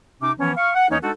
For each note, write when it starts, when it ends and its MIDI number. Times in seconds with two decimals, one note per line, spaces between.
0.22 0.32 48
0.22 0.32 61
0.22 0.32 63
0.22 0.32 86
0.39 0.52 52
0.39 0.52 53
0.39 0.52 59
0.39 0.52 61
0.57 0.73 77
0.57 0.73 85
0.57 0.73 89
0.75 0.88 78
0.90 0.98 40
0.90 0.98 52
0.90 0.98 58
0.90 0.98 61
0.90 0.98 63
1.03 1.11 56
1.03 1.11 62
1.03 1.11 63
1.03 1.11 66
1.03 1.11 69